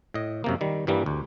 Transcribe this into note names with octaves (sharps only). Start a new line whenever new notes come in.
A2 D#5
F#2 C3 A#3
D#3 G3
G2 E3 G3 A#3
D2